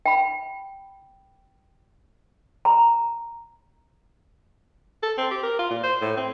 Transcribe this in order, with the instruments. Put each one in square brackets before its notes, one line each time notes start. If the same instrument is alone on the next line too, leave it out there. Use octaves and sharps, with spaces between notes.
[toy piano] G5 B5
A#5
[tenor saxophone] A4
C4
G4
A#4
F4
A#2
C5
A2
C4